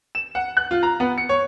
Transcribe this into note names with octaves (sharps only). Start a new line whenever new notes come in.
E7
F#5
F#6
F4
A#5
B3
C#7
C#5